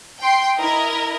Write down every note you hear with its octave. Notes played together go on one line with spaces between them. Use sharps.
G5 C6
E4 A#4 D#5